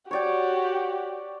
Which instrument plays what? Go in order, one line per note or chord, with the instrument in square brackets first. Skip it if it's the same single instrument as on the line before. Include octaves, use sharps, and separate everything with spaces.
[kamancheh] F#4 G4 [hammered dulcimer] C#5 D5 G5